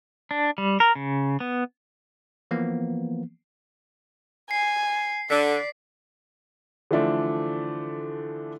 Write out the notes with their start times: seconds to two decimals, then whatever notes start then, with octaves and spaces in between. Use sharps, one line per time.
0.31 D4
0.58 G3
0.80 A#4
0.95 C#3
1.40 B3
2.51 E3 F3 A#3 B3
4.51 G#5 C7
5.30 D3 D5 B6
6.91 D3 E3 F3 A3 D4